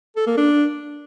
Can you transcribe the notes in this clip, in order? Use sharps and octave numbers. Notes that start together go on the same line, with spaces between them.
A4
A#3
D4